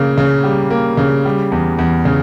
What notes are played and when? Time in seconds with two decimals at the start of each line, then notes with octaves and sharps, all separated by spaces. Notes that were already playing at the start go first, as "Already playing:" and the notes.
Already playing: C#3 A#3
0.18 C#3
0.44 G3
0.70 A#3
0.97 C#3
1.25 G3
1.52 E2
1.78 E2
2.05 C#3